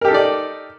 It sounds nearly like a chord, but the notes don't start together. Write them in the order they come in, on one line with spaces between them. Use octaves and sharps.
A#4 G4 A4 D#4 D5